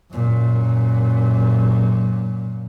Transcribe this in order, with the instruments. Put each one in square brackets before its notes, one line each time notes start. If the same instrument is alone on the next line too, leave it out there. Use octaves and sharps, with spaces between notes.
[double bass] F#2 A#2